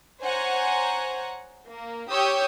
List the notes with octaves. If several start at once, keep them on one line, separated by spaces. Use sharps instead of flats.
C5 C#5 F#5 G#5 A#5
A#3
G4 C#5 D#6 E6 G6